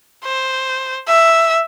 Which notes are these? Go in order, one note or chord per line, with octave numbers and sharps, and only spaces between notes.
C5
E5